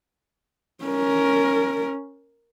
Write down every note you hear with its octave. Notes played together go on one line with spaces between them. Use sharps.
C#4 A#4